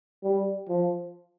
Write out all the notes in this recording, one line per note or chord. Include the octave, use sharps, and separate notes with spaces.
G3
F3